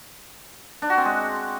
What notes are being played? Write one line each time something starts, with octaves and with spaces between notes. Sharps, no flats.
D4
F#4
C4
G#3